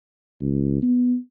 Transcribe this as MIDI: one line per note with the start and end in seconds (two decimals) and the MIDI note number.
0.41 0.79 37
0.82 1.16 59